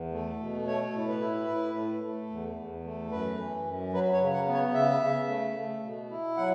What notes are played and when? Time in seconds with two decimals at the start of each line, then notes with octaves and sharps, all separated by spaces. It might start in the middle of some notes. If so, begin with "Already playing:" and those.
Already playing: E2
0.12 A3
0.40 B2
0.67 A3 C#5
0.95 A2
1.08 B4
1.21 E4
1.49 A2
1.75 A3
2.03 A3
2.30 E2
2.56 E2
2.84 A3
3.11 F#2 B4
3.39 E3
3.65 F#2
3.93 F#3 B4
4.13 C#5
4.20 C#3
4.34 F#5
4.48 B3
4.54 C#5
4.74 C#3 E5
5.01 C#3
5.28 A3
5.56 A3
5.83 B2
6.10 E4
6.37 F#3 F#5